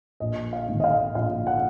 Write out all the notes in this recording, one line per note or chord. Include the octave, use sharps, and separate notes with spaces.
A#1 D#5
F5
G#2 D#3
D#5
F5
A#1 F5
F#5